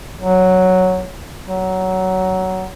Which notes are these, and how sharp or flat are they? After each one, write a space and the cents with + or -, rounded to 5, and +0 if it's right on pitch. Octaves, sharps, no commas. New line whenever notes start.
F#3 +0
F#3 +15